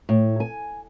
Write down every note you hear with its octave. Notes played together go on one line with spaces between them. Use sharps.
A2
G#5